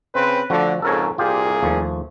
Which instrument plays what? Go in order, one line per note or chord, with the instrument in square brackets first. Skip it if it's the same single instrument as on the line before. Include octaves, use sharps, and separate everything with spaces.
[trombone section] C#3 C4 B4 [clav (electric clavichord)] C5
[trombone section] D3 [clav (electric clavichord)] F3 A3 F#4
[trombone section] F2 G#2 C#3 [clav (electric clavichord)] A4 A#4 C#5
[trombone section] C2 A#2 G#4 [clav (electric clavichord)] F4 G4
[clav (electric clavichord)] D#2 F3 A3